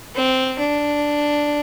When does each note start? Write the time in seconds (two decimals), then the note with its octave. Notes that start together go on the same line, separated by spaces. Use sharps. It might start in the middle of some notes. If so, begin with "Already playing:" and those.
0.15 C4
0.59 D4